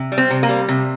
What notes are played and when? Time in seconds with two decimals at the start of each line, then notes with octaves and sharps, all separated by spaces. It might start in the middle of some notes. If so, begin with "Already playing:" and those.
Already playing: C3
0.12 G3
0.18 C4
0.30 C3
0.43 A#3
0.49 G3
0.69 C3